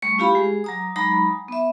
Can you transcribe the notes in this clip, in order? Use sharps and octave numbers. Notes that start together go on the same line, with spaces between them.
G3 A3 C#6
C#4 E4 F4 G4 F5 B5
G#3 G#4
F#3 A#5 D#6
F#3 G#3 D#4 A#5 B5 D#6
B3 E5